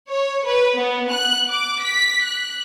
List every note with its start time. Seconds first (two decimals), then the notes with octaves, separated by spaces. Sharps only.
0.10 C#5
0.45 B4
0.76 B3
1.10 F#6
1.51 D6
1.82 B6
2.26 F#6